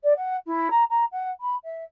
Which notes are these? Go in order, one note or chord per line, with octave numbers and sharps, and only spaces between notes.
D5
F#5
E4
A#5
A#5
F#5
B5
E5